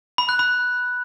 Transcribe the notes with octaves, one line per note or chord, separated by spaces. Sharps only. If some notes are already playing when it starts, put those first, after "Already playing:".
B5
F#6
B5